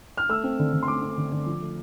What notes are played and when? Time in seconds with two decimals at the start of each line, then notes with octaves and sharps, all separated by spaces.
0.17 F6
0.29 A3 E6
0.44 C4
0.59 D3
0.73 D3
0.83 C6
0.88 A3 D6
1.02 C4
1.17 D3
1.32 D3
1.46 F3
1.62 A3